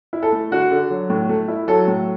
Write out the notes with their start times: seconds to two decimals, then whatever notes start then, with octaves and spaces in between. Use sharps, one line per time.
0.13 E4
0.23 A4
0.32 A3
0.51 D3 F#4
0.71 D3
0.91 F#3
1.10 A2
1.29 A3
1.48 E4
1.68 F#3 A4
1.88 A2